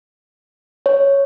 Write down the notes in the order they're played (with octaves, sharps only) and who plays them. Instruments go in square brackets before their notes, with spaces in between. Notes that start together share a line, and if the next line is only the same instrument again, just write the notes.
[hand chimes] C#5